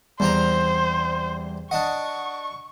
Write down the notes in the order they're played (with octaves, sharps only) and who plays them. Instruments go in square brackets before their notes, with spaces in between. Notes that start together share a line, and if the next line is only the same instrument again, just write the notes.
[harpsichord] E2 C4 A#5 [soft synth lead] G3 [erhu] C5
[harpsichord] D4 D#5 [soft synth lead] F#5 [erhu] C#6